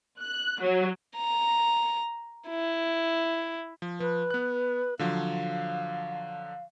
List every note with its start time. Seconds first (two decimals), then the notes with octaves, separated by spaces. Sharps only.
0.20 F#6
0.62 F#3
1.16 A#5
2.49 E4
3.82 F3
4.00 F3 B4
4.31 B3 F#6
4.99 D3 F3 F#3 F5